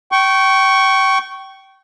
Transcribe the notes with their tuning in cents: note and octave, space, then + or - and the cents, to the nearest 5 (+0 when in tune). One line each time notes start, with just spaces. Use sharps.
G5 -25 C#6 +0